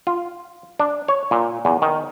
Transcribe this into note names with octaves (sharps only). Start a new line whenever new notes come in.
F4
D4
C#5
A#2
E2
D#3